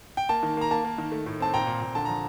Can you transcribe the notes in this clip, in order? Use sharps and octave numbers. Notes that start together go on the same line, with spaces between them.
G5
A#3 A5
D#3
A#3 A#5
A#3 A5
A#3
D#3
A3
A2
C4 A5
A#2 G5 A#5
A#2
A#2
D3 A5
F3 A#5